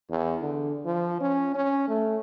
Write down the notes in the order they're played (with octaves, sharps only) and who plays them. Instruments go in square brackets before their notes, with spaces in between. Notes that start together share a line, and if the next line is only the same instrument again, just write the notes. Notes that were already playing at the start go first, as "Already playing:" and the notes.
[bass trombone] E2
D3
F3
C#4
C#4
A3